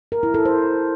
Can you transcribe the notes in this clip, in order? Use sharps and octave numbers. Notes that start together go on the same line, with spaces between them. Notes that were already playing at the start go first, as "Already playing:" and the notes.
A#4
E4
A4
C5